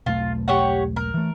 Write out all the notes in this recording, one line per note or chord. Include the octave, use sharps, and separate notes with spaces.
E1 B1 A3 F4
G4 C#5 F#5
A#4
E3 A3